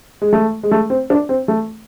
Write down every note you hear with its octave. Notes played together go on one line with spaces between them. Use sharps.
G#3
A3
G#3
A3
C4
D4
C4
A3